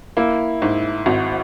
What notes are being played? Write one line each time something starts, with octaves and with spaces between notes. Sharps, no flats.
A#3 E4
G#2
G#1 F#4